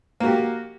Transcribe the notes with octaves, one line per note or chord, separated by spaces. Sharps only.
A#3 F#4 G4